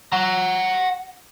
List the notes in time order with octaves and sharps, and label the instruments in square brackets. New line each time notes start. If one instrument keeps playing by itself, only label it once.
[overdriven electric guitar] F#5 A#5